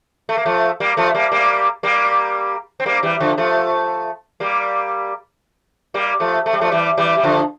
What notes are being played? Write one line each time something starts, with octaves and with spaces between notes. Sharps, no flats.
A3
A#3
F3 A3
G3 A#3
F3 A3
G3 A#3
G3 A#3
G3 A#3
C4
G3 A#3
E3 G3
D3 F3
F3 A3
G3 A#3
G3 A#3
F3 A3
A3
G3
F3 A3
E3 G3
E3 G3
G3
D3 F3